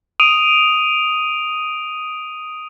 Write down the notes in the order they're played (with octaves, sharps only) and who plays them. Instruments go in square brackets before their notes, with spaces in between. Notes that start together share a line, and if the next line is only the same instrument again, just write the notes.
[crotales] D#6 D7 D#7 F7